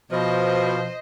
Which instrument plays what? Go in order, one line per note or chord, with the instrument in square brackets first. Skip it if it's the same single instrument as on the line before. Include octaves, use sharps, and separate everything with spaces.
[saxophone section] B2 F3 [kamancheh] C5 D#5